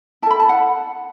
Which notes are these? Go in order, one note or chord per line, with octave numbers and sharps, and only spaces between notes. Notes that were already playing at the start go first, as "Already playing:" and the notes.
E4 A4 A5 B5
A5
F#5